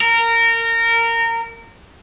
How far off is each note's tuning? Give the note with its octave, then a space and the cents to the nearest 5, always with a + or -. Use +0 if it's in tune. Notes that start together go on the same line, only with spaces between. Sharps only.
A#4 -20